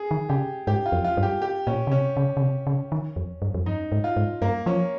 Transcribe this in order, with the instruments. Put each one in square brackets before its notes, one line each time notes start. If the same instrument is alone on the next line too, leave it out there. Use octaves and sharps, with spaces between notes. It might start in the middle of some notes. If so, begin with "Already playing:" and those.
Already playing: [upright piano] G#4
[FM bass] D#3
[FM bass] C#3 [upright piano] G4
[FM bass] G#2 [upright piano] G4
[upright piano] F4
[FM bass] F2
[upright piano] F4
[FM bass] G2
[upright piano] G4
G4
[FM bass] A#2 [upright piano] C#4
[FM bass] C#3
[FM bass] C3 [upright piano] C#4
[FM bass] C#3
C#3
C3
C#3
D#3
F2
G2
F2
[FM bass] G2 [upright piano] D#4
[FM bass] G#2
[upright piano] F4
[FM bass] G#2
[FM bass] G2 [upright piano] A#3
[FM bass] F3 [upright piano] C#4